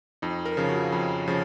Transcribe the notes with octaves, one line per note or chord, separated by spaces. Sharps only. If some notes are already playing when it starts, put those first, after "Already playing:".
F2 D#4
A#4
C#3 F3
F#4
F2
C#3 F3